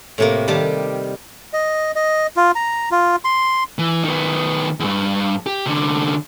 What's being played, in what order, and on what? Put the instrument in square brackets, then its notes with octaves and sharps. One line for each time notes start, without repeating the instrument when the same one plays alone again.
[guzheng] A2 C3 A#3
D#3 G3 G4 A5
[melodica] D#5
D#5
F4
A#5
F4
C6
[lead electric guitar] E3
D#3 B3
E2 G2
G4
C2 D3